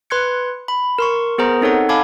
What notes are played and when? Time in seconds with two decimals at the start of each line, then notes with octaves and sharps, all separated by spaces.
0.10 B4 C6 F#6 G#6 C#7
0.68 B5
0.99 A#4 C6 C#6
1.38 B3 G#4 A#4 C5 A#5
1.61 C4 D#4 A4 C#5 F#5
1.89 F5 G#5 A5 B5 D6 G#6